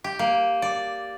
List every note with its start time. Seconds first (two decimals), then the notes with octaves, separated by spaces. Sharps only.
0.04 G4
0.19 A#3
0.62 D5